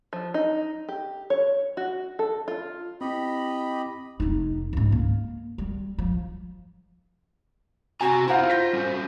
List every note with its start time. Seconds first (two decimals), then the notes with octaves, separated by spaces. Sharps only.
0.13 F3
0.34 D#4
0.89 G4
1.30 C#5
1.77 F#4
2.19 A4
2.48 F4
3.01 C4 E4 G4 D#5 B5
4.20 F1 D#4
4.73 C#2 G#2
4.92 A#3
5.58 G3
5.98 F3
8.01 C3 C4 F#4 G#5 A#5
8.28 E4 F4 C5 F5 F#5 A#5
8.50 F4 G6 A#6 B6
8.73 G3 C#4 F#4